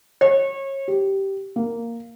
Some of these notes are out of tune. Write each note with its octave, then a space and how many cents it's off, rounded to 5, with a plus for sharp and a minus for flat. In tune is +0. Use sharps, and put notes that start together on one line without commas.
C#5 -30
G4 -10
A#3 -5